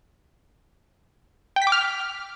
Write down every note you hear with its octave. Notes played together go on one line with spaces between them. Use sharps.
G5
B6
D6
F6